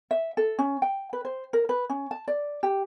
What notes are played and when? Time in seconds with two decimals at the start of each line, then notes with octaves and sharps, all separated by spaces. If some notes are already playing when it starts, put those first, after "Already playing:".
0.11 E5
0.37 A4
0.59 C#4
0.82 G5
1.13 B4
1.25 C5
1.53 A#4
1.69 B4
1.90 C#4
2.11 A5
2.28 D5
2.63 G4